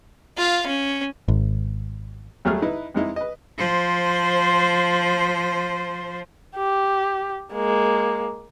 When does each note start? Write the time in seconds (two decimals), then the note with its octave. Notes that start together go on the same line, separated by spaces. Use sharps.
0.37 F4 F5
0.66 C#4
1.28 G#1
2.45 D#2 F#3 G3 A3 G#4 F6
2.62 D#4 E4 B4
2.94 F2 G#3 D#4 E4
3.16 B4 D#5
3.58 F3 C5
6.56 G4
7.53 G#3 A#3